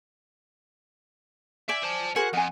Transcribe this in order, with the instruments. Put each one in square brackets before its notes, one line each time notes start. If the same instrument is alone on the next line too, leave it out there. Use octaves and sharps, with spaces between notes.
[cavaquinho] D5 G5 G#5 [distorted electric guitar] E5
[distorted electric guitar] C5 A5
[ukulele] F#4 A#4 [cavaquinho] G#4 C5 G#5 [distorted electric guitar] F#5
[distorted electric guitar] F2 [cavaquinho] D#5 [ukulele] F#5 G#5